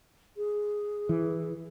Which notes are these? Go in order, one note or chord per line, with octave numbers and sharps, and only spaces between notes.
G#4
E3